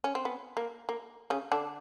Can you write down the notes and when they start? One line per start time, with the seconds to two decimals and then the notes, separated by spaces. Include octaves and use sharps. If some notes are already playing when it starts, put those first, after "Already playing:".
0.04 C#4
0.15 C4
0.25 B3
0.57 A#3
0.89 A#3
1.30 C#3 C#4
1.52 D3 D4